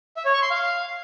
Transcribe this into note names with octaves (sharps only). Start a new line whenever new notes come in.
E5
C#5
C#6
C6
F5